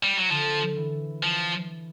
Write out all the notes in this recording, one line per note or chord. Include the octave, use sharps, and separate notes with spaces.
G3
F#3
D3 F3
E3
F3